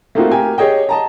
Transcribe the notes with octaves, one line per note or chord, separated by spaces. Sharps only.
A3 A#3 C4 D#4 F4 F#4
G4 A#4 G5 G#5
G4 G#4 C#5 D#5 G5
D#5 A5 A#5